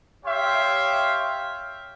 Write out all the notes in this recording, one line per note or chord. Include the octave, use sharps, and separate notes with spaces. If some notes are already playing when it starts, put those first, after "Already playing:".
G4 C#5 E5 F5 G5 C6